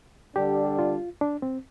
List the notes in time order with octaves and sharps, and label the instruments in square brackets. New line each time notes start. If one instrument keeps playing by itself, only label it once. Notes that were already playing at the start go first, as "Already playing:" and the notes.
[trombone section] D3 G3 D4 [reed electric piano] G4
[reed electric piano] F4
D4
C4